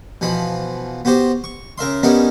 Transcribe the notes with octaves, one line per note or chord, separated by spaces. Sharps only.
B2 E3 F3 B5
B3 F#4 G4 C5
C#6
C#3 A#4 E5 C6
G3 B3 C#4 D#4 E4 A#4